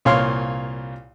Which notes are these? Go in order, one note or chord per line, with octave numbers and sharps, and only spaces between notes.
C2 A#2 C#5 F5 C6 F6